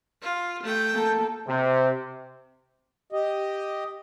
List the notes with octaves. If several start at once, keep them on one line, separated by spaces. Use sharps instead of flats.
F4
A3 G5
A#3 A4
C3
G4 D#5